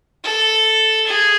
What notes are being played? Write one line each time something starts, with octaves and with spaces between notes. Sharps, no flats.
A4
G#4